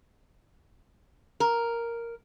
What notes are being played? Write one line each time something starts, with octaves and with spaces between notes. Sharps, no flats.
A#4